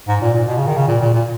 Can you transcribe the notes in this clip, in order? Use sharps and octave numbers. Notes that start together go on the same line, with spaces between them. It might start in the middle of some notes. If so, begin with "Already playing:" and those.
G#2
A#2
A#2
B2
C#3
D#3
C#3
A#2
A#2
A#2